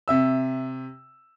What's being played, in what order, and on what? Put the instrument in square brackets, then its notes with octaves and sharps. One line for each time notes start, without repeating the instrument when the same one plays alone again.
[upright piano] C3 E5 E6